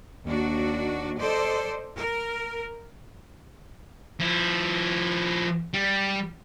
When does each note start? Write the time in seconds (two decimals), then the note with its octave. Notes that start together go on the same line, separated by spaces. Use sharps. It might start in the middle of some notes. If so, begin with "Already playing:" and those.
0.25 D#2 D4 F#4
1.18 A4 C5 D5 D#5
1.96 A#4
4.20 F3 E4
5.74 G3